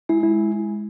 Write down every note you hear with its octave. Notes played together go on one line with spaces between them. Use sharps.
G#3 E4
E4